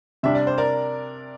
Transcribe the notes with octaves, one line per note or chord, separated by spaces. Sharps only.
C3 G3 D4 E5
D5
C5
A#4 D5